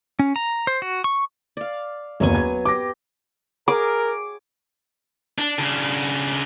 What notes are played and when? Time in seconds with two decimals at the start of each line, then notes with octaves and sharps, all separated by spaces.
0.19 C#4
0.36 A#5
0.67 C5
0.82 F#4
1.04 C#6
1.57 D5 F5
2.20 F#1 D#2 F#3 B3 G#5
2.35 G#6
2.65 G4 D6 A#6
3.68 G#4 A#4 D6
5.38 D4
5.58 C#3 D4